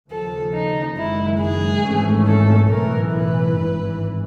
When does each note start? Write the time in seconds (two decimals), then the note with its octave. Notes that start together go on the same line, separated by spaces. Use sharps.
0.10 D#2 C#3 F3 A4
0.54 D#4
0.97 F#1 F#2 D#3 G#3 E4
1.40 G#4
1.84 G#1 G#2 E3 A3 C#4
2.27 A4
2.70 B1 A2 E3 A#4
3.12 B4
3.56 G#1 G2 E3